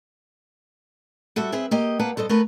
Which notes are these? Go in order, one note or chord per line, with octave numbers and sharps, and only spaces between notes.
G3 F#4 A4 E5
C4 G#4 B4 E5
A#3 G4 D#5
A#3 B4 F5 F#5 A5
G2 A4 C5 D#5
A3 B3 A#4 B4